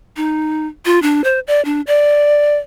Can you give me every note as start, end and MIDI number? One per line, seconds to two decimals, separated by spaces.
0.16 0.67 63
0.85 1.01 65
1.02 1.23 62
1.24 1.39 72
1.47 1.63 74
1.65 1.81 62
1.87 2.58 74